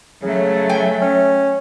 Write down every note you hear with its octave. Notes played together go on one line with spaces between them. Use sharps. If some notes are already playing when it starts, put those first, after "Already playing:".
C#3 F#3 A3
G5 G#5
C#4